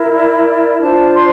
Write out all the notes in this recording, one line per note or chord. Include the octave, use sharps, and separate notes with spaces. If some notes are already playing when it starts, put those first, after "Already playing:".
Already playing: E4 A#4
D5
D4 F4 C5 A5
C6